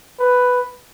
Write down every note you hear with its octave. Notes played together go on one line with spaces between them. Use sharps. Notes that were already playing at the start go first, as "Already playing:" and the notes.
B4